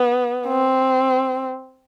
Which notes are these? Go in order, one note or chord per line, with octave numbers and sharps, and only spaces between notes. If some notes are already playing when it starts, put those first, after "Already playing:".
Already playing: B3
C4